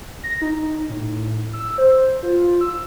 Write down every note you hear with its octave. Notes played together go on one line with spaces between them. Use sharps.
A#6
D#4
A2
E6
C5
F4
E6